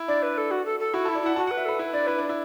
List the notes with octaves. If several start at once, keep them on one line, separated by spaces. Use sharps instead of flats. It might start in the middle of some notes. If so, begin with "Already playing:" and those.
Already playing: E4
D4 D5
B4
A4
F#4
A4
A4
E4 F#4
A4
E4
D5
E4 F#5
F#4 A5
F#5
B4
E5
A4 B4
E4
D4 D5
E4 B4
D4
E4